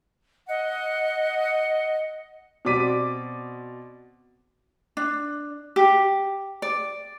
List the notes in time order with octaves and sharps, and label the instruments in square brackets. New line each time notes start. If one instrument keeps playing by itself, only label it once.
[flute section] D#5 F#5
[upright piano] B2 C4 D5 D6 B6 D#7
[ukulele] D4
G4
D5